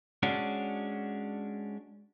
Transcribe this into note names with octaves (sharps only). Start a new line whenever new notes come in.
G#3 C#4 D4 F#4